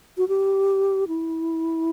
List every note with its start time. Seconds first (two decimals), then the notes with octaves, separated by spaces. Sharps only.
0.17 F#4
0.28 G4
1.08 E4